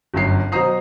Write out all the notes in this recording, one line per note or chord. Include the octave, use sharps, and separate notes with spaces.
G1 F#2 C7
B2 F#3 C5 A#5 D#6 C7